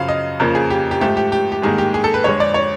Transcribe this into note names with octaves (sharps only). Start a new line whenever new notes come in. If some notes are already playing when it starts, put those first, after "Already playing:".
Already playing: F#2 C#3 F3 F5
D#5
F2 C#3 F3 A#3 A#4
G#4
G4
G4
G#2 F3 A3 G4
G4
G4
G4
G#2 D#3 G3 A#3 G#4
G4
G#4
A4
B4
F2 D3 F3 G#3 C#5
D5
C#5